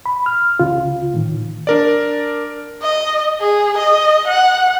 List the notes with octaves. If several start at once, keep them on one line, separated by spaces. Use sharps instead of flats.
B5
F6
C#2 C#3 F4
A2 D#3
D4 A#4 D5
D#5
G#4
D#5
F#5